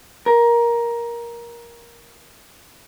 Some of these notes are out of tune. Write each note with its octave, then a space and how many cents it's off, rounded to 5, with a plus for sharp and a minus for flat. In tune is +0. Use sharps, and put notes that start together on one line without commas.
A#4 +15